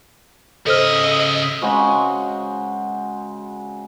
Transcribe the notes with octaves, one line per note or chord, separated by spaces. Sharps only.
C#3 A4 C5 D#5 E5 F6
C#3 G#3 C4 F#4